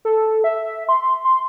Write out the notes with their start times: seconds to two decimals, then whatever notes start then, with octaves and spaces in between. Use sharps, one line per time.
0.05 A4
0.44 E5
0.89 C6
1.25 C6